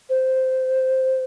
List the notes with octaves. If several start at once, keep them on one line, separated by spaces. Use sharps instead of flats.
C5